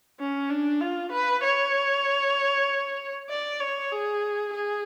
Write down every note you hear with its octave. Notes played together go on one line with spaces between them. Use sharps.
C#4
D4
F4
B4
C#5
D5
C#5
G#4
G#4